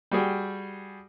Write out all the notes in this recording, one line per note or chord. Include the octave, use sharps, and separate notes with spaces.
G3 F#4 G#4 G5